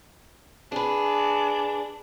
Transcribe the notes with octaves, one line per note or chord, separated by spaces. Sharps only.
D4 G#4 B4